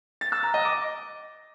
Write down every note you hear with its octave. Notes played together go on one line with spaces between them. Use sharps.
A6
E6
A#5
D#5
D6